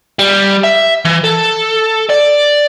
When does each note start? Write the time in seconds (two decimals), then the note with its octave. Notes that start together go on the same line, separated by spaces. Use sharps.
0.19 G3
0.64 E5
1.05 E3
1.24 A4
2.09 D5